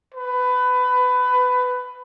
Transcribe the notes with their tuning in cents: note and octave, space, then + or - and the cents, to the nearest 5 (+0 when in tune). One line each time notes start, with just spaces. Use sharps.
B4 +20